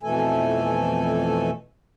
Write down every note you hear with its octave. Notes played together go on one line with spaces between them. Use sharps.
F2 B2 E3 A3 A4 G#5